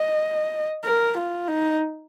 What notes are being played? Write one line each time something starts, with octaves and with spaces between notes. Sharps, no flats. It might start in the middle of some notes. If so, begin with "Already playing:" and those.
Already playing: D#5
A#4
F4
D#4